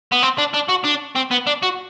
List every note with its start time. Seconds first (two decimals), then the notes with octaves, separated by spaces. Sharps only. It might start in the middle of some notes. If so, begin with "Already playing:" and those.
0.12 B3
0.23 C4
0.38 D4
0.54 D4
0.69 F#4
0.85 D4
1.16 C4
1.31 B3
1.47 D4
1.63 F#4